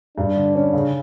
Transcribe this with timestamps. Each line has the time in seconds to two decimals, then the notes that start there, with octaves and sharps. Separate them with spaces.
0.18 G2 D4
0.36 D3
0.55 C#4
0.73 C#3